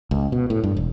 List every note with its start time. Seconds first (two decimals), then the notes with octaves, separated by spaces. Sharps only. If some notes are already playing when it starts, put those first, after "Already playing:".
0.11 C#2
0.32 B2
0.50 A2
0.64 G2
0.77 E1